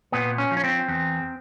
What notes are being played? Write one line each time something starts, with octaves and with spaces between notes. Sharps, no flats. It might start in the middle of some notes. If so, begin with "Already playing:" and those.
A#2 B3
C#4
F3
C#4
C4
E2